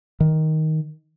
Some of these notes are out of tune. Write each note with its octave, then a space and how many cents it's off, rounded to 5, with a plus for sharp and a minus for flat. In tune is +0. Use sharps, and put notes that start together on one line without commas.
D#3 +10